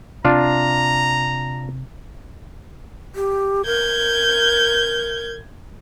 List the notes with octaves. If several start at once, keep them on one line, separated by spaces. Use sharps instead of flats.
C3 C4 D4 F4 A#5
G4
A#4 G6 G#6